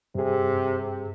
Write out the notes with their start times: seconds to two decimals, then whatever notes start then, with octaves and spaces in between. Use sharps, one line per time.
0.15 G2 C3 G#4